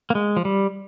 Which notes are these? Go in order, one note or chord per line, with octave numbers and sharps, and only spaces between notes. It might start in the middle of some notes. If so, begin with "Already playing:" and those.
A#3
G#3
F3
G3